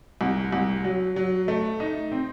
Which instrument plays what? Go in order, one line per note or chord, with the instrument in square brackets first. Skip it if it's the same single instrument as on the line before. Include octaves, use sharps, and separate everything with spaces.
[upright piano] C2
C2
F#3
F#3
A3
D#4
C4